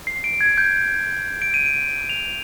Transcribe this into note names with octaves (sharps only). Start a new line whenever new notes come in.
C7
D7
G#6
G6
D7
D#7
D7
F7